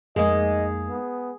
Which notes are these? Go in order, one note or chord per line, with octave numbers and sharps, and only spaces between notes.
F2 G#3 A#3 D#4 G#4 D#5
B3